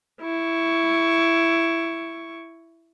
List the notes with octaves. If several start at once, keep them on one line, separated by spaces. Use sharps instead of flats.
E4 C#6